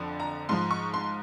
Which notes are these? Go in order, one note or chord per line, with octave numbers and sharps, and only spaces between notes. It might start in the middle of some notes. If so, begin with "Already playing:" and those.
Already playing: F2 D3 F3
A#5
G#2 F3 C6
C#6
C6